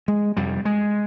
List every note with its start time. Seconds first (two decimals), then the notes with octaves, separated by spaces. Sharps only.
0.08 G#3
0.37 F2 C3 G3
0.65 G#3